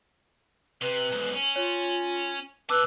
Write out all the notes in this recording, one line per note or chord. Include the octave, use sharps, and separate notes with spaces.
C3 B4
B1 G#2
C#4
F4 C#5
A#2 B4 A5 D6 E6 F#6